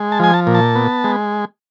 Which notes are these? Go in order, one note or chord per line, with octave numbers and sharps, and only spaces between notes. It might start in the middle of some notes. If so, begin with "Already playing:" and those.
Already playing: G#3
A5
F3 G#5
A5
A#2
A5
B3
G#3